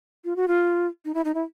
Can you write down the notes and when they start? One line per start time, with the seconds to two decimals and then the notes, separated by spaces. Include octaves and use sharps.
0.25 F4
0.36 F#4
0.48 F4
1.05 D#4
1.14 E4
1.25 D#4
1.35 E4